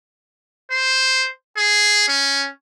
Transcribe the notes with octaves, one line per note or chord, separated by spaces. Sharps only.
C5
G#4
C#4